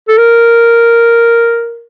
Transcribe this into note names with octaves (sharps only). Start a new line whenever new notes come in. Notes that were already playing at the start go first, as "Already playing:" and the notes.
A4
A#4